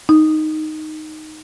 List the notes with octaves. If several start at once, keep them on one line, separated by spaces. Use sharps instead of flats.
D#4